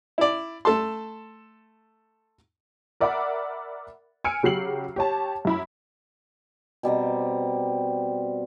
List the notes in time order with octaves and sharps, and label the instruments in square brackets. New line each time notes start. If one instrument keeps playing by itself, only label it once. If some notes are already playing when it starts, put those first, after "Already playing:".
[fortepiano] E4 D5
A3 A4 A5 C6
[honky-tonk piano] A#4 D5 E5 F#5 B5 D6
G#5 E6 F6 C#7 D7
C#3 F#3 G4 C7 F#7
G4 C#5 A5
F#2 E4 B5
[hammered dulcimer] B2 G3 C4 A#5